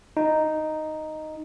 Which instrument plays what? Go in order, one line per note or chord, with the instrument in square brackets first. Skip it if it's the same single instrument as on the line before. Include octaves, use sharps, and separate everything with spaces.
[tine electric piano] D#4